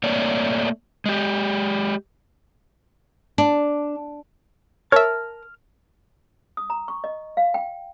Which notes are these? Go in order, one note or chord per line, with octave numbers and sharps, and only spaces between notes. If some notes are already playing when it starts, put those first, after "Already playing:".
A3 A#3 C#5 D5
G#3 G4
D4
A#4 C#5 E5 A5 F6
D#6
A#5
C#6
D#5
F5
G5